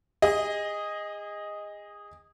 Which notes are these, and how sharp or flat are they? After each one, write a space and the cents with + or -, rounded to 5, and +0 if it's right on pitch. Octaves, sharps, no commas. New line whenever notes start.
G#4 -30 D#5 +0